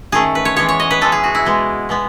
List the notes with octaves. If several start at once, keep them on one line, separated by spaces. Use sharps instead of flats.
D#3 A3 C#4 G#4
B4
C#5
E3 G#3 B3 C#5
C#5
D#5
B4
E3 G#3 B3 A4
G#4
F#4
E4
B2 G#3 B3
B2 G#3 B3